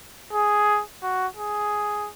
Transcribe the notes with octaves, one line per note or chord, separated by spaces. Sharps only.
G#4
F#4
G#4